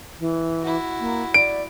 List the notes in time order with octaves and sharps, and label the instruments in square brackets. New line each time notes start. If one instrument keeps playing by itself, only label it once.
[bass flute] E3
[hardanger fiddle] E4 F#4
[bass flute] A#3
[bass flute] D5 [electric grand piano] D7